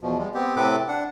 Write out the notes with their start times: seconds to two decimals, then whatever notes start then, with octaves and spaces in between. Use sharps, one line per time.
0.01 E2 B2 F3
0.18 G3 G#3
0.34 B3 C4 G4
0.56 A2 C3 C4 A4 B4 D6
0.88 D4 F#5